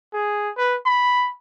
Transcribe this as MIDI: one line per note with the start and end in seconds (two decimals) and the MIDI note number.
0.13 0.50 68
0.57 0.75 71
0.86 1.32 83